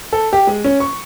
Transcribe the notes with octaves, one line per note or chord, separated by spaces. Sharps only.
A4
G4
G#3
C#4
C#6